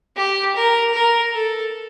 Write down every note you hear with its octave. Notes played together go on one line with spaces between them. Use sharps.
G4
A#4
A#4
A4